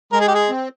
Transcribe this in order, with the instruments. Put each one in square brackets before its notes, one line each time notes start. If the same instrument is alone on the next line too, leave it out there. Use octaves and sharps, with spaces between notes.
[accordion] G#3 [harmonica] A#4
[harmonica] G#4
G4
G#4
[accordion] C4